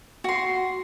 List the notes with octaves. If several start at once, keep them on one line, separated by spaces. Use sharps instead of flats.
F#4 C6